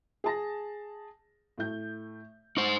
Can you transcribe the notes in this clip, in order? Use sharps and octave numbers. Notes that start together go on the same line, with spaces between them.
G#4 A5 A#6
A2 A3 G6
D#4 C5 C#6